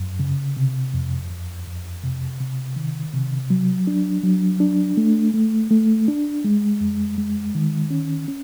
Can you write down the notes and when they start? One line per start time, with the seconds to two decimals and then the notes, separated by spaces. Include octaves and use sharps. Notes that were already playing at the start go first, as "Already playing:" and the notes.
Already playing: F#2
0.19 C#3
0.57 C3
0.94 F2
1.30 F2
1.67 F2
2.04 C3
2.40 C3
2.76 D#3
3.14 C3
3.50 F#3
3.87 D4
4.23 F#3
4.60 D4
4.97 A3
5.34 A3
5.70 A3
6.08 D4
6.44 G#3
6.81 F2
7.18 G#3
7.55 D#3
7.91 C#4
8.28 C#4